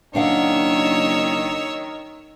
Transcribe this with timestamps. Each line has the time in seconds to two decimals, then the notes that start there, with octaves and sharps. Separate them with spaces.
0.15 F#1 D#3 D4 C#5 F5 F#5 E6